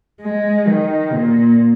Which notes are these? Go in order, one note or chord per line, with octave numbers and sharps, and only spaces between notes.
G#3
D#3
A#2